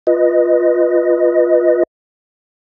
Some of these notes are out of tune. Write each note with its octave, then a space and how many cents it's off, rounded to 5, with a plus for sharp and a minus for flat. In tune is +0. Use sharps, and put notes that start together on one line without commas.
F4 +0 B4 +0 D#5 +0